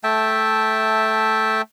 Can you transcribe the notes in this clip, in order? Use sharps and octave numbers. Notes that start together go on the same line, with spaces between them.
A3 E5 G5 A5